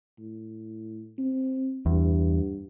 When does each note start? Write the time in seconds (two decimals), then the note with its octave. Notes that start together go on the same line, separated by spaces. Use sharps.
0.19 A2
1.18 C4
1.86 E2 G2